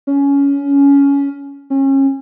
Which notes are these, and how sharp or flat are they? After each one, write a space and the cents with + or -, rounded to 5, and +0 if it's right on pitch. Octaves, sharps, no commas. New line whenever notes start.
C#4 +15
C#4 -30